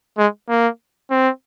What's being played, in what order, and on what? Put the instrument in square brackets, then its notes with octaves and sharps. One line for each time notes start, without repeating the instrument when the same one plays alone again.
[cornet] G#3
A#3
C4